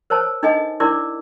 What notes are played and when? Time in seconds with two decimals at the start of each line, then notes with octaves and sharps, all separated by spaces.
0.10 A#4 C5 C#5 A5
0.43 D4 D#4 A4 D#5 G#5
0.80 D4 E4 A#4 D5 D6